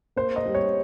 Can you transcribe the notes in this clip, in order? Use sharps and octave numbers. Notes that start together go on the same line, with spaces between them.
A#3 C5
D#5
G3
C#5